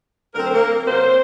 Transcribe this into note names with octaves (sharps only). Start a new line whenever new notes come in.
D2 D3 F#3 C4 A#4
C5
A#3 A#4
C3 F#3 A#3 C4 C5